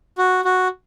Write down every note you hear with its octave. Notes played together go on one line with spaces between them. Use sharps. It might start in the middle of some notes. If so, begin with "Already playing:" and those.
F#4
F#4